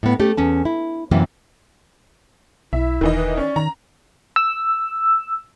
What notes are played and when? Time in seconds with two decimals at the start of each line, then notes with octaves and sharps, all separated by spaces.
0.03 A2 B3
0.20 A3 C#4 G4
0.37 E2 C#4 A5
0.65 E4
1.11 F#2 C3 E3 F#3 G3 A#3
2.73 B1 E4 E5
3.01 E1 D#3 E3 D#5
3.16 B4
3.37 C#4 D5
3.56 D#3 A#5
4.36 E6